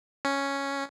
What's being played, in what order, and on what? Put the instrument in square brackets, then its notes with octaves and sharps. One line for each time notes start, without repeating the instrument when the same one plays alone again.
[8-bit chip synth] C#4